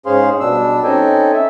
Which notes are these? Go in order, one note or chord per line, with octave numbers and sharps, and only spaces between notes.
G#2 C#4 G#4 C5 F5 C6
B2 G3 D4 E6
C4 C#4 D#4 A4 G5 G#5
E5